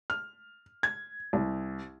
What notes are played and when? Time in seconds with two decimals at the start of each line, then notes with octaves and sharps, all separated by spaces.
0.10 F6
0.83 G#6
1.33 C2